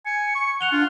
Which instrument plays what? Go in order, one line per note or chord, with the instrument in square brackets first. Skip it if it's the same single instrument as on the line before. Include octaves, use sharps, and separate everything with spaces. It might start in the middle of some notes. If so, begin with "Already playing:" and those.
[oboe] G#5 [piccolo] C#7
[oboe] C#6
[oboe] F#5 [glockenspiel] F#6 F7 G7
[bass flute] D4 [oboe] F4